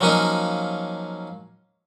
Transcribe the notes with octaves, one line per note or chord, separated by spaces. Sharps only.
F3 F#3 A#3 C#4 D#4